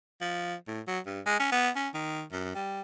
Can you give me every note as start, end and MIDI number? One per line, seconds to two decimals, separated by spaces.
0.21 0.55 53
0.68 0.81 45
0.87 0.99 54
1.06 1.21 43
1.26 1.35 56
1.40 1.48 61
1.52 1.70 59
1.76 1.89 61
1.94 2.23 51
2.32 2.53 42
2.55 2.82 55